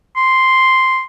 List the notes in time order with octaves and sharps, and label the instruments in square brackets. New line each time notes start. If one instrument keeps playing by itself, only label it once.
[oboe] C6